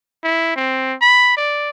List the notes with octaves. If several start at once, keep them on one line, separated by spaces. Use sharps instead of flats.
E4
C4
B5
D5